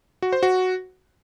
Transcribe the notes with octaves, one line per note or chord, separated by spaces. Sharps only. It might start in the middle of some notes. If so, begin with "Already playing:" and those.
F#4
C5
F#4